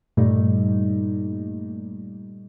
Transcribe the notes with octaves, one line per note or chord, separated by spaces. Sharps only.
G2 A#2 G3 A3 D#4